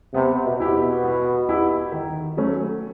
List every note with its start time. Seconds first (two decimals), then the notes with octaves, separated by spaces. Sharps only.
0.14 C3 B3
0.45 B2
0.60 E4 G4
0.74 B2
1.04 B3
1.49 E4 G4
1.92 D#3
2.37 F#3 A3 C#4